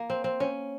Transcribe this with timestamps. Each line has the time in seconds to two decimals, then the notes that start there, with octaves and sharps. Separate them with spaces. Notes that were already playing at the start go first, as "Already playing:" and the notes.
Already playing: A#3
0.10 C4
0.24 C4
0.40 C#4